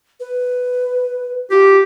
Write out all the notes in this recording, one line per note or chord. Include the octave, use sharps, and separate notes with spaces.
B4
F4 G4